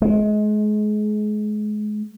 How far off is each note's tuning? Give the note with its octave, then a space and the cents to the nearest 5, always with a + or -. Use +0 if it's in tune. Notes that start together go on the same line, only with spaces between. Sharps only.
G#3 +30